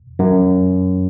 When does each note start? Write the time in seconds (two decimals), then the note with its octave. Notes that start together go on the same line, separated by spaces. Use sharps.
0.19 F#2